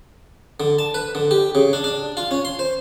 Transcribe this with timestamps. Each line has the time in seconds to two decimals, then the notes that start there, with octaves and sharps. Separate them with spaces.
0.60 D3
0.79 A5
0.94 B4
1.15 D3
1.31 G4
1.55 C#3
1.73 D4
1.84 D4
2.17 F4
2.31 C#4
2.45 C6
2.59 C5